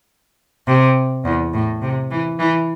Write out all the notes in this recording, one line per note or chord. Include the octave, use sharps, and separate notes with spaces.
C3
E2
A2
C3
E3
E3